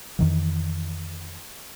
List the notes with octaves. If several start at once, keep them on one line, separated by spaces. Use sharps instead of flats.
F2 D#3 E3